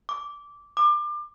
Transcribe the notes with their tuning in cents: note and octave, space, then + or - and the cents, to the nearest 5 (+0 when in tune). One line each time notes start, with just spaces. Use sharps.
D6 -15
D6 +30